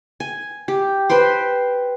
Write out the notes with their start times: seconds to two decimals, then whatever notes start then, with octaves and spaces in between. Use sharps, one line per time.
0.20 G#5
0.68 G4
1.09 B4 C5 G5 C6